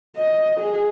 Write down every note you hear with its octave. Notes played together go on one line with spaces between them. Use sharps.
D#5
G#4